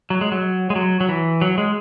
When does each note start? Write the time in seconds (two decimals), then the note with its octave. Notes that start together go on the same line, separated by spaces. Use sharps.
0.10 F#3
0.21 G#3
0.32 F#3
0.70 G#3
0.76 F#3
1.00 F#3
1.09 E3
1.41 F#3
1.58 G#3